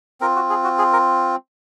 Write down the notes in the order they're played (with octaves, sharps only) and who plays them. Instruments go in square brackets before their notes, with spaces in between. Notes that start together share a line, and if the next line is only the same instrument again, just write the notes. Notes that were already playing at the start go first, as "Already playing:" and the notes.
[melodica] C4 F4 A#4
F#4
G#4
F#4
G#4
A#4